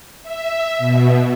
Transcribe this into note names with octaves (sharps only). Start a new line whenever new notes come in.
E5
B2